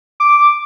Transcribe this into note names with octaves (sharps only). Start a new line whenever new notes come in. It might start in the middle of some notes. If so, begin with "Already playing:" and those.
D6